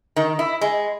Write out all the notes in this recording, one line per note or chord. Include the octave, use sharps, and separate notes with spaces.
D#3
E4
G#3